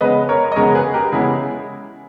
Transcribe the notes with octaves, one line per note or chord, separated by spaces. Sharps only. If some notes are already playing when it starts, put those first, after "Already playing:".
C#3 G#3 B3 B4 D#5
A#4 C#5
D#5
C#3 G#3 B3 A#4 C#5
G#4 B4
G4 A#4
C#3 G#3 B3 E4 G#4